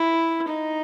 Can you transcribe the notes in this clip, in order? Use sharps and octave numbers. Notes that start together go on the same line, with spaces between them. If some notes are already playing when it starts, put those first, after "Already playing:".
Already playing: E4
D#4